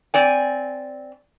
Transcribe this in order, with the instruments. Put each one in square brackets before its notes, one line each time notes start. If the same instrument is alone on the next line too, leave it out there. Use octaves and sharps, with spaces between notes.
[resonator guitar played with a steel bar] C4 D5 G#5